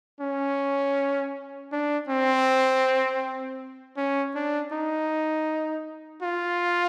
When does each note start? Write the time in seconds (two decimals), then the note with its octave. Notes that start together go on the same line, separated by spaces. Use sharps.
0.21 C#4
1.72 D4
2.09 C4
3.97 C#4
4.35 D4
4.73 D#4
6.22 F4